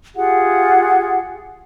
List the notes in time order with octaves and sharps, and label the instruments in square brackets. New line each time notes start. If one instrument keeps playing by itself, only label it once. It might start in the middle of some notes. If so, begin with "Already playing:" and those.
[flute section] F4 G4 G#4 F#5